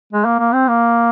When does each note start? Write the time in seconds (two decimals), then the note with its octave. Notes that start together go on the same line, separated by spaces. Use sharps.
0.13 G#3
0.25 A#3
0.39 A#3
0.54 C4
0.68 A#3